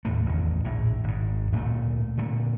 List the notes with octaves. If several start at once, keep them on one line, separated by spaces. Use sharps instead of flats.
D#2 A2 A3
A1 E2 D#3
A#1 A2
G#1 G#2
D1 A#2 G3 A3
A#2 D3 A3